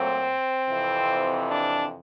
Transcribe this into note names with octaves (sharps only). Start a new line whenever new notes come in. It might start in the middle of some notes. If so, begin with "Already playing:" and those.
Already playing: A#2 F#3 A3 C4
F2 C3 E3
D4